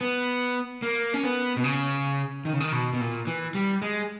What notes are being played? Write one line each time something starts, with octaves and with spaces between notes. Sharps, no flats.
B3
A#3
C#4
B3
B2
C#3
D#3
C#3
D#3
B2
B2
A#2
E3
G3
G#3